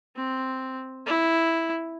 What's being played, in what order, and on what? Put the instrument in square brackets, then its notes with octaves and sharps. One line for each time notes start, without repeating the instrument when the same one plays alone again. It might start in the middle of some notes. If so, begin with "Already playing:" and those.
[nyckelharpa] C4
E4